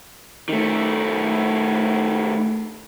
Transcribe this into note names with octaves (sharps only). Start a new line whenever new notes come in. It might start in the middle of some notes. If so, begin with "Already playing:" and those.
D#3 A3